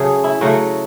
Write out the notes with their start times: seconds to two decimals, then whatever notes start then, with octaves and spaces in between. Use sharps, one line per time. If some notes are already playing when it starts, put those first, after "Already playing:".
Already playing: C#3 F#3 A3 G#4
0.24 E4
0.41 C#3 F#3 A3 F#4